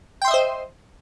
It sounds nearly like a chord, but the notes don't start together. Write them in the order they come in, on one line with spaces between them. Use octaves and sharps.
G5 C6 E5 D#5 C5